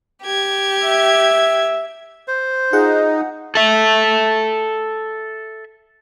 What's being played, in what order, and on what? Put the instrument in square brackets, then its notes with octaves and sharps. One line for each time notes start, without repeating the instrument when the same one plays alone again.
[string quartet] G4 G#6
[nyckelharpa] E5
[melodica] C5
[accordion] D#4 [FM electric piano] F4 G#4 F#5
[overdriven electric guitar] A4 E5